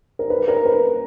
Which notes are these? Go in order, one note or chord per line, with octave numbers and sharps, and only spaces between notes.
A#4
B4
A#4
B4